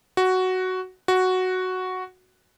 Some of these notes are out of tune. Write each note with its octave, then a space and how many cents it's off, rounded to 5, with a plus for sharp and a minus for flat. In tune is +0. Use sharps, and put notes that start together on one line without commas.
F#4 +5
F#4 +0